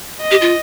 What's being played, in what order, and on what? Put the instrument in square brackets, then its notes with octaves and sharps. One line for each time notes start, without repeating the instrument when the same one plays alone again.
[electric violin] D#5
[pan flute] G4
F4